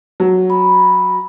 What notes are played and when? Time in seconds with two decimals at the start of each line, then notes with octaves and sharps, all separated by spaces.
0.20 F#3
0.50 B5